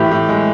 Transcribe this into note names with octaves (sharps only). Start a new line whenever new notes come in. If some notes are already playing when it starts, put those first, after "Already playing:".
Already playing: A2 E3 G4
A2
G#3